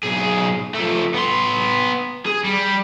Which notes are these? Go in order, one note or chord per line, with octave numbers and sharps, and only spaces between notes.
B1 G#4
F3 A3
B3 C6
G#4
G3